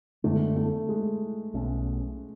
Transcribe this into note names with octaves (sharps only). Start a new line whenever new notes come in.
F#2 D3 G#3 A3 D4
A3
G#3
B1 B2 A3 C#4